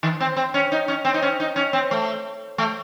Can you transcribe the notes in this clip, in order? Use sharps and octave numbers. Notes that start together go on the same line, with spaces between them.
D#3
C4
C4
C#4
D#4
C#4
C4
D#4
C#4
D#4
C#4
C4
A3
A3